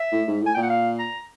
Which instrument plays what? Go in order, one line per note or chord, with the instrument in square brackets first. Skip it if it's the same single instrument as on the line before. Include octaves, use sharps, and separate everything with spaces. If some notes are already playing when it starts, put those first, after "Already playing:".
Already playing: [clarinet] E5
[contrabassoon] A2
G#2
A2
[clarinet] G#5
[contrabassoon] A#2 [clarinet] G5
[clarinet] F#5
F5
A#5